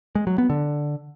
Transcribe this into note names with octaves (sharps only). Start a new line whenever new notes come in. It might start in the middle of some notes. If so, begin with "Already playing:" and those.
G#3
F#3
B3
D3